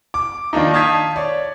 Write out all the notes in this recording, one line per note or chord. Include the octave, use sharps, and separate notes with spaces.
D6
D#3 F3 A#3 D4 D#4
F5 A5 D#6 G6 G#6 B6
C#5 D5